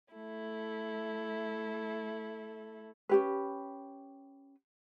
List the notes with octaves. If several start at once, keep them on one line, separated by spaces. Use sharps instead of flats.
A3 E4 A4
C#4 G4 B4